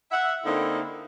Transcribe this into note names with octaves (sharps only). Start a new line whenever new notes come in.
E5 F#5
D3 A#3 C4 D#4 E4